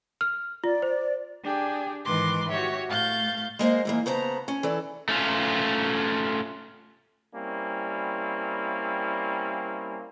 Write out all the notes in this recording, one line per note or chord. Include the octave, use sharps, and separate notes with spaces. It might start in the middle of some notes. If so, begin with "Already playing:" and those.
F6
F4 D5
C5
D4 G4 G#4 G5
G#2 D#3 E3 B4 C6 D6
F#4 G4 C#5 E5
A2 A3 F5 G6 A6
G#3 A#3 C5 D#5
G#2 E3 A#3
C#3 B3 C5 A5 A#5
C#4
E3 A4 D5
A3 C#4 F4
G3 A#3 C4 C#4 E4